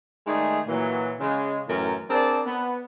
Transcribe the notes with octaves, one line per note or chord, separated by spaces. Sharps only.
D#3 G#3 A3 D#4 G#4 D5
A#2 E3 F#3
C#3 G#3
F#2 A2 E3 A#4
C4 D4 G#4 A#4 D5 A5
B3